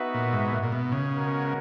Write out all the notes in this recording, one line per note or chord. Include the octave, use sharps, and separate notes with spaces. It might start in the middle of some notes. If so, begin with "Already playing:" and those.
Already playing: B3 D#4 F#4 B4 E5
A#2
G#2
A#2
A#2
B2
C#3
G#3 B3 F#4 A#4